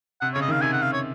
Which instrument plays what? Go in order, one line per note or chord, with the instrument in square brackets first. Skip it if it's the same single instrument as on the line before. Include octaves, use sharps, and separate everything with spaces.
[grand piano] C3 [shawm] F#5
[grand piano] C#3 [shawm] C#5
[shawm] D#5
[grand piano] D#3 [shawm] F5
[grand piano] C3 [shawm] G#5
[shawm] F#5
F5
C#5